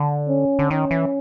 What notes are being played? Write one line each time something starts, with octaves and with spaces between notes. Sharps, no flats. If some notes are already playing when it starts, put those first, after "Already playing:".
Already playing: D3
C#4
D3
D#3 C#4
E3